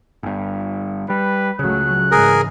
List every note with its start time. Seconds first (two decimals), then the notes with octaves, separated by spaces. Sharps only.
0.23 G1 G2
1.10 G3 B4
1.59 C#2 C#3 F#3 A3 F#6
2.12 G#2 E3 G#4 A#4